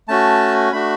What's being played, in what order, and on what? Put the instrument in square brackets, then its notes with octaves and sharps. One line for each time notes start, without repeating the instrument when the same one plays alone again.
[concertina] A3 C#4 F#4 A5
A3 D4 F#4 B5